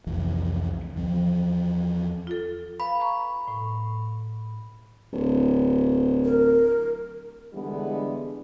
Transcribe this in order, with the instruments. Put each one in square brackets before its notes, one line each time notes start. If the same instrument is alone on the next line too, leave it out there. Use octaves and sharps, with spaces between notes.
[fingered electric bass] C2 F2 E3
E2 F3 C4
[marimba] F4 A4
[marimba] B4 F5 [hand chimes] B5
[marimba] A#5 C#6
A2
[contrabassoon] D1
[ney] A#4
[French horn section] D3 E3 G3 G#3 B3 D4